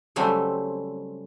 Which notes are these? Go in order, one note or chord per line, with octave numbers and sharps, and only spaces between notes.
C#3 F#3 G3 A3 C4